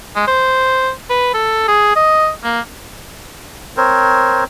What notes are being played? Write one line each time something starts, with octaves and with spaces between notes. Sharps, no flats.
G#3
C5
B4
A4
G#4
D#5
A#3
C4 A#4 C5 C#5